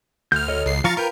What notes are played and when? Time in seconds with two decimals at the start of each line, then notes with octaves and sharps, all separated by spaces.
0.32 D2 F6 G6
0.48 A4 C#5 D#5
0.66 C#2 C7
0.84 F3 F5 A#5 C#6 A6
0.97 F4 A#4 B4 G5